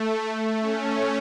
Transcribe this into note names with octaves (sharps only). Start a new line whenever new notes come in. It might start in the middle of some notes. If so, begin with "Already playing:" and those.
Already playing: A3
A3
C#4